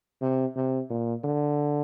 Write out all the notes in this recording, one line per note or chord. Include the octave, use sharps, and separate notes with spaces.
C3
C3
A#2
D3